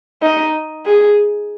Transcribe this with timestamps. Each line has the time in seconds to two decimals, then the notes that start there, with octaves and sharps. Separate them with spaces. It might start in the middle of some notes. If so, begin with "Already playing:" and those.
0.22 D#4
0.86 G#4